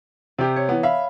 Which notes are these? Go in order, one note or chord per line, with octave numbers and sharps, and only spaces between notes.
C3 G4 D5
C#5
E3 B3
E5 F5 B5